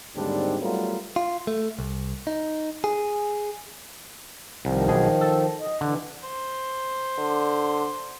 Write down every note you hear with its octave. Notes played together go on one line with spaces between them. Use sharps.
D#2 G#2 D3 G3 C4 D4
F#3 G3 A3 B3 F4 A#4
F4
A3
C2
D#4
G#4
C2 D#3 F3
B1 B2 G#4
A4
D#5
D3 E3
C5
D3